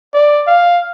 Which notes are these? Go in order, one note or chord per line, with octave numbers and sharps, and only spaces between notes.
D5
F5